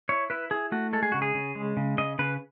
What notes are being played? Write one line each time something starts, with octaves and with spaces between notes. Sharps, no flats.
E4 C#5
E4 B4
E4 G#4
A3 F#4
G#3 A4
G#4
C#3 F#4
G#4
C#3
G#3
C#3
C#3 D#5
C#3 B4